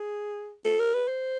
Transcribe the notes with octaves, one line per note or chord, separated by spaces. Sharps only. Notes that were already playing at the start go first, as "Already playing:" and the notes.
Already playing: G#4
A4
A#4
B4
C5